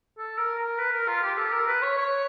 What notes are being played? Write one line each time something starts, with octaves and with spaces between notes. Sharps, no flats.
A4
A#4
A#4
B4
A#4
F4
G4
A4
A#4
B4
C#5
C#5